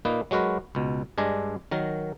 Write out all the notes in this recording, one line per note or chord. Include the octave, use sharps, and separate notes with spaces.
A#2 A#3 D#4 B4
F#3 G#3 F#4 A#4 B4
C#2 B2
G2 G#3 D4 G#5 A#5
D#3 F#3 A#4